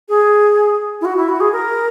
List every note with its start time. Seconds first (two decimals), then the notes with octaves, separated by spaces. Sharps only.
0.09 G#4
1.01 E4
1.05 F#4
1.17 E4
1.29 F#4
1.40 G#4
1.52 A#4